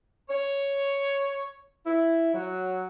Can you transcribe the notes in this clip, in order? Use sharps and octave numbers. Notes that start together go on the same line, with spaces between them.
C#5
E4
F#3